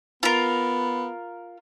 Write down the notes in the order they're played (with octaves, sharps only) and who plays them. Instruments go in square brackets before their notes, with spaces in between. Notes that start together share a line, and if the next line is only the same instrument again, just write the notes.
[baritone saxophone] B3 [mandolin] F4 A#4